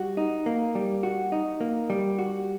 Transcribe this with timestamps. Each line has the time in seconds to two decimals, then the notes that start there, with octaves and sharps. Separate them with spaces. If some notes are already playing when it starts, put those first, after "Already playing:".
Already playing: G3 F#4
0.17 D#4
0.46 A#3
0.75 G3
1.03 F#4
1.32 D#4
1.61 A#3
1.90 G3
2.19 F#4